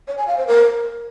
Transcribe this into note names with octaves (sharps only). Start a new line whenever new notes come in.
C#5
G#5
F5
C5
A#4